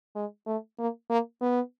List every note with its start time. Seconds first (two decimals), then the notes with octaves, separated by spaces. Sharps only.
0.15 G#3
0.46 A3
0.79 A#3
1.10 A#3
1.41 B3